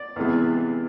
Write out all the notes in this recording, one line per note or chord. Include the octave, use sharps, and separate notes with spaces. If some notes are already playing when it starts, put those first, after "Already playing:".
Already playing: D5
E2 C3 E3 G#3 B3